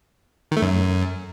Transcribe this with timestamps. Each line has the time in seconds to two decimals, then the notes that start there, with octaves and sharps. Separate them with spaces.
0.51 D#3
0.57 A3
0.62 F#2